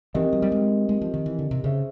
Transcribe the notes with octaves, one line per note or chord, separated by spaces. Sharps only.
E3 C4 D#4 G4 A#4 D#5
F#3
G3
G#3
G#3
F3
D#3
E3
D3
C3
C#3 G#4 C5 E5